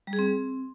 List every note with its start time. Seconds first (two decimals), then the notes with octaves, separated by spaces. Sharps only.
0.07 G3
0.13 G#4
0.19 C4